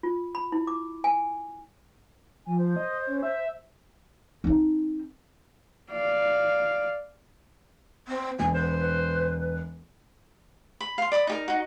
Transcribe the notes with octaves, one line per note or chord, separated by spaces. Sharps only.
F4
B5
E4
D6
G#5
F3 G#5
C5
D#5
C#4
E5
C4 D#4
D5 F5
C4
E1 G#5
B4 C5
B5
F5 C6
D5 B5 D6 D#6
D#4 G4 A#4
D#4 F#4